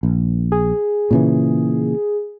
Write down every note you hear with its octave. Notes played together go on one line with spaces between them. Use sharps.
A#1
G#4
A#2 C#3 E3